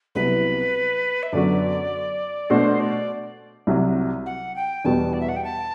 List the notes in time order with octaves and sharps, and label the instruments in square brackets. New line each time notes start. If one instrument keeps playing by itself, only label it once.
[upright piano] C2 C3 F#3 B3 E4 [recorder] B4
[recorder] E5
[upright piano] F#2 D3 F#3 B3 F#4 [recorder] D5
[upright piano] B2 A3 D4 F#4 [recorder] C5
[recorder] D5
[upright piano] C2 C3 F#3
[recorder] F#5
G5
[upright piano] E2 B2 G3 B3 F#4 [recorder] A5
[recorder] D5
E5
F#5
G5
A5